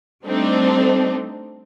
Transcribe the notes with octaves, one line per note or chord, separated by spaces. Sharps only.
G3 A3 C4 D4 D#4